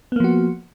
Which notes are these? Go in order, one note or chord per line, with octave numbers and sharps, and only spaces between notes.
F3 A#3 B3 F#4